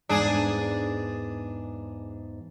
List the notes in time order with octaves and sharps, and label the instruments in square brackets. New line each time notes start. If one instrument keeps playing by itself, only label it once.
[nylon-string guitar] E2 G#2 [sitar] D4 G#4